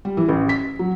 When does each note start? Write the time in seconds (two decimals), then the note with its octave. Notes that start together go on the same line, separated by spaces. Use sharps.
0.05 G3
0.17 E3
0.29 A1
0.49 B6
0.79 F#3